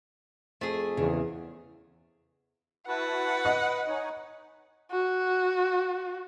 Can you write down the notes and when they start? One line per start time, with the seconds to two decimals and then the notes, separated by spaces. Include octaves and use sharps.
0.61 F2 A3 G#4
0.97 E2 C#3
2.88 E4 F#4 B4 F#5 A5
3.45 D#5
3.88 D#4 C#5 G#5
4.92 F#4